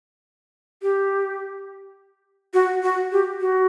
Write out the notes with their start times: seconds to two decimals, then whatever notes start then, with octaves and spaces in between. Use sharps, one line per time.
0.82 G4
2.54 F#4
2.83 F#4
3.12 G4
3.41 F#4